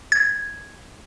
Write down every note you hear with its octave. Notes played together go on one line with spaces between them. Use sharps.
G#6